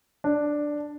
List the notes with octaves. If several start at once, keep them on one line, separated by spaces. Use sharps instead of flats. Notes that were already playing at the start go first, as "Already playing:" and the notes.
D4